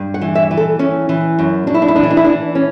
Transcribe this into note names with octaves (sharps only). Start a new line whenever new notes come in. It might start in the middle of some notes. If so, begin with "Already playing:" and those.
Already playing: G2
F#5
E3
E5
E3
A4
E3 C#4
E3
F#2
F#2 D4
E4
D4
E4
E3 D4
E4
D4
E4
E3 D4
C#4